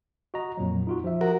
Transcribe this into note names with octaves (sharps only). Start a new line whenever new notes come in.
F#4 D#5 A#5
F2 A#2 F#3
D#4 F4 F#4
F3 E5
F#4 A#4